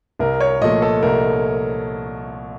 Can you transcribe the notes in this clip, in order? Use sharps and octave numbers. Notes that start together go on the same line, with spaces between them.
C2 A#4
C#5
A#2 F3 A3 D#5
A4
C2 A#4